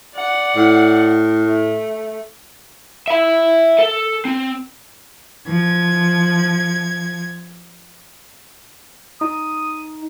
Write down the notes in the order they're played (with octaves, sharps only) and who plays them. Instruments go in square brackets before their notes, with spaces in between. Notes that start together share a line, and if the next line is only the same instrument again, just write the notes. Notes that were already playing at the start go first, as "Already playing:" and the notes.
[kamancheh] D5 F#5
[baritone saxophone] A2
[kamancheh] A3
[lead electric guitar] E5 B5
A4
C4
[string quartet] F3 G#6
[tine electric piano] D#4 [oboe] D#6